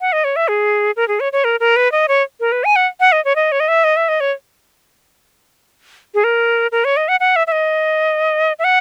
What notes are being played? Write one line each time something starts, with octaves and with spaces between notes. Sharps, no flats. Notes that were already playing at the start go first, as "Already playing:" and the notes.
F#5
D#5
C#5
E5
G#4
A#4
G#4
C#5
C#5
A#4
A#4
B4
D#5
C#5
A#4
B4
G#5
F#5
F#5
D#5
C#5
D#5
C#5
D#5
E5
D#5
E5
D#5
C#5
G#4
A#4
A#4
C#5
D#5
F#5
F#5
E5
E5
D#5
E5
F#5